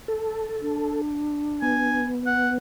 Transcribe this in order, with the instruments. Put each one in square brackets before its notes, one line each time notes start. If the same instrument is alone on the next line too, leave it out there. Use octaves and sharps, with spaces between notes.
[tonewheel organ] A4
[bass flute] D4
[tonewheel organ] B3 [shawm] G#5
[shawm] F#5